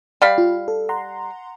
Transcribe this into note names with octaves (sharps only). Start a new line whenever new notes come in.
G3 F5 B5
F4
A4
F#5 A#5 C6